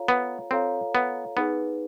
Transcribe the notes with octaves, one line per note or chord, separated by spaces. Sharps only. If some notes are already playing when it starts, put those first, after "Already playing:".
Already playing: F4 A4 C#5 F5 A#5
B3
C4 F4 A4 C#5 F5 A#5
B3
B3 D#4 G#4 B4